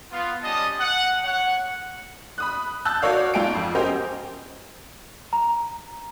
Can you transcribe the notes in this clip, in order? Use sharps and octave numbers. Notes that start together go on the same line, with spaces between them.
B3 F4
G3 C#4 D#5 A5 D#6
F#5
C#5 F#5
B5 D#6 F#6
A5 E6 F#6 G6
F#4 A#4 C#5 D5 F5
G#2 F4 G5 A5 D7
F2
C#4 G4 A#4 C5 D#5
A#5